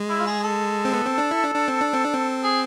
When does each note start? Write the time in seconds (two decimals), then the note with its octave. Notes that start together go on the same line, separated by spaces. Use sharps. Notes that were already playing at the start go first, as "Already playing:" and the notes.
Already playing: G#3
0.10 E4
0.19 F4
0.26 G#4
0.44 A4
0.85 C4
0.93 B3
1.06 C4
1.18 D4
1.31 E4
1.44 D4
1.55 D4
1.68 C4
1.81 D4
1.93 C4
2.04 D4
2.14 C4
2.43 G#4